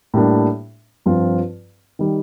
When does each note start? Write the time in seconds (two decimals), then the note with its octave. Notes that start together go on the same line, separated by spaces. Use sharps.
0.14 A2 G3 A#3 D4
1.06 G2 F3 C4 F4
1.99 D#3 G3